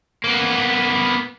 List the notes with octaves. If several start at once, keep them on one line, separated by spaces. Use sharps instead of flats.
A#3 B3